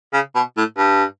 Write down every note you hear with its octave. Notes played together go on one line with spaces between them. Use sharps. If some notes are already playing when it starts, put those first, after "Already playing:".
C#3
B2
A2
G2